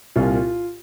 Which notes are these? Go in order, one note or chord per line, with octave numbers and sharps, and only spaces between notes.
C2 A#2 F4